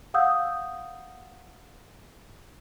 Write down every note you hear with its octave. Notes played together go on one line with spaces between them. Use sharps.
F5 F#5 D#6 E6 G6